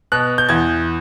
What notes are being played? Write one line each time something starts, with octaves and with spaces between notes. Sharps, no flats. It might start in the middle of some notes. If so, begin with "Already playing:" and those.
B2 F#6
G6
E2 G#6